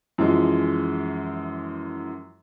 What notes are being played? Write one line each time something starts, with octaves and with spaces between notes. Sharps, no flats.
F#2 E3 F3 G#3